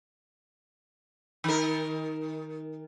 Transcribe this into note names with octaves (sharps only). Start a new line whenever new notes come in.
D#3 A#4